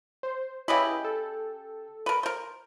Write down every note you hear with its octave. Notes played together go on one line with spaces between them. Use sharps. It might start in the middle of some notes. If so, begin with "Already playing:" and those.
C5
C#3 E4 G4 B4 D#5 B5
A4
A#4 B4
A#4 C5